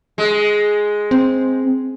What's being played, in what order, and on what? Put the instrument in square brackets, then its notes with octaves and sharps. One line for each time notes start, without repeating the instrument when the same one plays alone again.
[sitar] G#3
[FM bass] C4